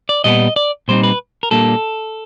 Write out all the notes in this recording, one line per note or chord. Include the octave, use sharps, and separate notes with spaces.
D5
A#2 G3 B3 D#5
D5
A#2 G3 C4 D#4 C5
B4
A#4
A#2 G3 A#3 D4 A4